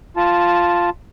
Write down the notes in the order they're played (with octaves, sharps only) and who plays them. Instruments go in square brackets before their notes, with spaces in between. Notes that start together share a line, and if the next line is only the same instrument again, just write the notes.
[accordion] F4 A5